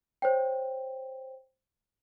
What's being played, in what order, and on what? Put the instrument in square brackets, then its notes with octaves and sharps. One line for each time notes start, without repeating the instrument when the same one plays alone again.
[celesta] C5 C#5 G5